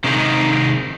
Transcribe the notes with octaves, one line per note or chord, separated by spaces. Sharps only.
C3 D#3 G#3 D#4